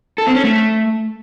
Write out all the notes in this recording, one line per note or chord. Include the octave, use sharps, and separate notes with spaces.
A4
C4
C#4
A3